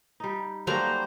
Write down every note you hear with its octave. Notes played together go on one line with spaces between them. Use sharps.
G3 D#4
F#3 G3 A#3 C#4 A4 C5 A#5